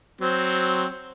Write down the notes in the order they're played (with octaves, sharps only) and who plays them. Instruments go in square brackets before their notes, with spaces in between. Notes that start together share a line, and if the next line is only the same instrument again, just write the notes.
[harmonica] F#3 C4